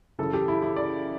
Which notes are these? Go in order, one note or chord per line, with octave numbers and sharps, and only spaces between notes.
F#2 C#3 E3 A4
G4
E4
E4
D5